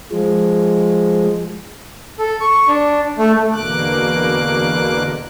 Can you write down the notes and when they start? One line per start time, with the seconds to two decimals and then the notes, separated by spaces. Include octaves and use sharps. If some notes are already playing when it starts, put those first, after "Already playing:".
0.12 F3 G#3
2.19 A4
2.41 C#6
2.68 D4
3.18 A3
3.51 E2 B2 D3 A#3 D6 F#6